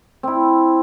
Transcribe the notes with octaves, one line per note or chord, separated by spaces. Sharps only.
C4 E4